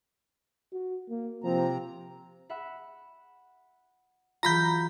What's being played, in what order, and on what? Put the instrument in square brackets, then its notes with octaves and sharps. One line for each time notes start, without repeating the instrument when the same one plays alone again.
[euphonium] F#4
A#3
[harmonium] C3 C4 A#5 [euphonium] F3
[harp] E5 F#5 B5
[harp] E3 F#3 F4 [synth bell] A#5 B5 G6